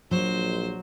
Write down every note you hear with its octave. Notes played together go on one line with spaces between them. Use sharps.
A#1 F#3 C5